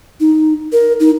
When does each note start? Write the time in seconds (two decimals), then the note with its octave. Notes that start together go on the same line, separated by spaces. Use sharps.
0.20 D#4
0.72 A#4
1.00 D#4